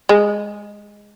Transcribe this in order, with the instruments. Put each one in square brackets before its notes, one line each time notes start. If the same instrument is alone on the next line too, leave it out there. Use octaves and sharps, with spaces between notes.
[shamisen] G#3